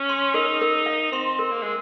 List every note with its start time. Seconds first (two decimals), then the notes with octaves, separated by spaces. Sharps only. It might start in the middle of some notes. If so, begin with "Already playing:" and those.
Already playing: C#4
0.09 C6
0.34 D#4 A#4
0.61 A#4
0.86 F5
1.12 C4 C6
1.39 A#4
1.51 A#3
1.63 G#3 A#4